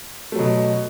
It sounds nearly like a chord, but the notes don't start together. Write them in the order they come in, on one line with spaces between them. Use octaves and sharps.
A3 F#3 B2